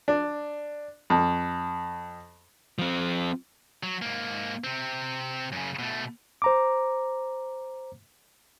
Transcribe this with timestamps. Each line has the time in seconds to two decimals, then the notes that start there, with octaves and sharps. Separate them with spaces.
0.08 D4
1.10 F2
2.79 F3 C4
3.83 F#3
4.02 G#2 A#3
4.64 C3 C4
5.52 F#2 C#3
5.79 B2 A3
6.42 C5 A#5 D6